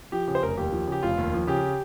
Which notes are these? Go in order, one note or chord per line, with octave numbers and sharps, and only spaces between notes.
F3 G4
C#3 G4
C5
F1 A#4
D#2 G4
F3
C#3 G4
F1 F4
D#2
F3
C#3 G4